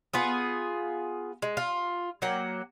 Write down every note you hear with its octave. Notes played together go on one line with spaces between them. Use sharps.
B3 F4 G#4
G#3
F4
F#3 A#3 F#5 G5